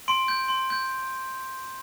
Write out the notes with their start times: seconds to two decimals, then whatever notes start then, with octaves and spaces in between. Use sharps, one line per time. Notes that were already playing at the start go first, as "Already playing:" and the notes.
0.08 C6 D7
0.28 G6
0.48 C6
0.70 G6